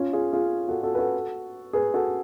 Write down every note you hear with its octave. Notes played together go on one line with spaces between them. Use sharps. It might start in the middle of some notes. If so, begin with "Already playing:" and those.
Already playing: C#4 F4
F4 G#4
F4 G#4
F#4 A4
F#4 A4
B4
F#4 A4
G#4 B4
F#4 A4